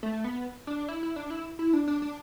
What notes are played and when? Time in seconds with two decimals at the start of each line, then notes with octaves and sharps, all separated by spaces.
0.03 A3
0.24 B3
0.67 D4
0.88 E4
1.03 E4
1.16 D4
1.30 E4
1.59 E4
1.73 D4
1.88 D4
2.02 D4